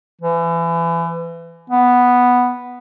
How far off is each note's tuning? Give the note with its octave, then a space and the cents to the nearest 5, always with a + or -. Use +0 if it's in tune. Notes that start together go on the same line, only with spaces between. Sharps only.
E3 +30
B3 +0